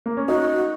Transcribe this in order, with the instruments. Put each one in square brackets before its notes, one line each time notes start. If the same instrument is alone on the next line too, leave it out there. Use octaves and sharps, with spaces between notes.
[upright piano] A#3
C#4
[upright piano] D#4 [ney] F#4